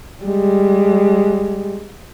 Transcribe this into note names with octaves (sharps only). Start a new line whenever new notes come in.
G3 G#3